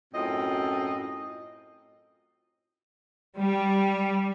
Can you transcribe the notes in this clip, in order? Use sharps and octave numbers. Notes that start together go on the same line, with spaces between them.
F#2 A2 C4 F4 D#5
G3